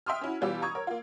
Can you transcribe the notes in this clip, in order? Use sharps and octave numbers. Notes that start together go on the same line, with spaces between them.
E5 G5 C6 D#6 F6
C#4 E4 F#4
B2 E3 G3 F4 G4 E6
A#5 C#6 D#6 G#6
A#4 C#5
A#3 F4